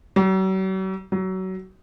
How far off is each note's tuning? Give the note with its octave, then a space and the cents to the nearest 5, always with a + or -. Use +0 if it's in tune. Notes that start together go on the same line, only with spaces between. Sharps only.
F#3 +45
F#3 +25